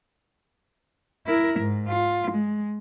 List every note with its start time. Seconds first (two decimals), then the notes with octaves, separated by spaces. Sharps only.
1.27 E4 A#4
1.60 G#2
1.88 F4
2.32 G#3